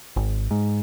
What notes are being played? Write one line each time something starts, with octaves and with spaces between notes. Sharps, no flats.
G#1
G#2